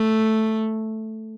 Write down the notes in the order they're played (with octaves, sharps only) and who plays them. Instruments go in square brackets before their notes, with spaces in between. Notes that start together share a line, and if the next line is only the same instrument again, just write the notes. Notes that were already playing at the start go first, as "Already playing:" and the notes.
Already playing: [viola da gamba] A3